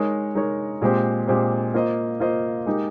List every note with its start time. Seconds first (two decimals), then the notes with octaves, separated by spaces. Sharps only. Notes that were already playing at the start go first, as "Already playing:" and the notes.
Already playing: G#3 D#4 A#4 C#5
0.35 G#3 D#4 A#4 C#5
0.81 A#2 G#3 C4 G4 C5
1.27 A#2 G#3 C4 G4 C5
1.74 A#3 F4 C5 D#5
2.20 A#3 F4 C5 D#5
2.66 G#3 D#4 G4 A#4